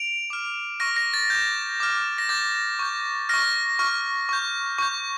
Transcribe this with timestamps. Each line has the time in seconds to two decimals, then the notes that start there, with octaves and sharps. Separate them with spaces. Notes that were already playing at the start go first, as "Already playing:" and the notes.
Already playing: D7 F7
0.30 D6 F6
0.80 C#6 F6 A#6
0.96 A#6
1.14 A6
1.30 D6 G6
1.80 D6 F6
2.18 A#6
2.29 D6 G6 A6
2.79 C#6 G6
3.29 C#6 F6 A#6
3.79 C#6 F6
4.29 C#6 G6
4.79 C#6 G6